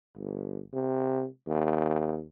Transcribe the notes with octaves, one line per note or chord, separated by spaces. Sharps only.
G1
C3
D#2